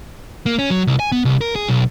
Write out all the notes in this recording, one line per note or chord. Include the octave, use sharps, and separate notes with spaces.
A#3
C#4
F#3
C2
G#5
B3
C2
A#4
G#4
B1